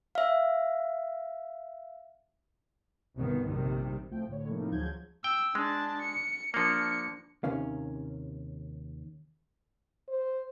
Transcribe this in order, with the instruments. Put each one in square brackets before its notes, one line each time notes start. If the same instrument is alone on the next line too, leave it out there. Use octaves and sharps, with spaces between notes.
[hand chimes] E5 F5
[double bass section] G1 C2 B2 D#3 B3
A#1 C3 D#3 G3
[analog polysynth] C2 F3 A3 G5
A2 D3 C#5
A2 C3 F3 A#3 D#4
D2 F3 F#3 G#3 G6 G#6
[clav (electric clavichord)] G5 [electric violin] E6
[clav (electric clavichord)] G#3 [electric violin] D4 A5
[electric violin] C#7
[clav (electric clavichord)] F3 A#3 [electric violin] D4 C#7
[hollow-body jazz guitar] D#2 C3 D#3 C#4 F5
[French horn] C5